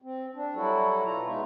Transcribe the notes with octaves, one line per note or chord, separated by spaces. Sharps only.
C4
D4
F#3 G3 E4 F#4 A4
B2 F4 A#5
G#3 B3 D#4 F4 E5